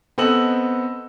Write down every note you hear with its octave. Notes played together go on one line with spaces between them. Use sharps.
B3 C4 A4 D#5 E6 F#7